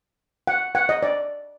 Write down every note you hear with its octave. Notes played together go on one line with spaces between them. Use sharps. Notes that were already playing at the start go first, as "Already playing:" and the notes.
F#5
F#5
D#5
D5